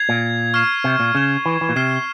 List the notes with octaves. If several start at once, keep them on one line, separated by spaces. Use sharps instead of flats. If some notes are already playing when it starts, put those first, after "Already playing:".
Already playing: G#6 C7 F7
A#2
C#6 F6 C7 E7
C3
A#2
C#3 F6 G#6 E7 G7
E3
E3
A#2
C3 F6 C7 E7 G7